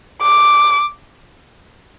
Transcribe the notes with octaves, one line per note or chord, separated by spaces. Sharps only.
D6